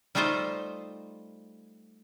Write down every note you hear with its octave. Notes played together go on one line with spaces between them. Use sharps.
G3 A3 D#4 F4 C5 D#5